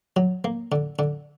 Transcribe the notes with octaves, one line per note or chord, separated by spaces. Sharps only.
F#3
A#3
D3
D3